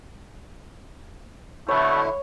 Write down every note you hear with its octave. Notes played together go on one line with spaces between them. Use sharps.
B2 D3 A3 E4 C#5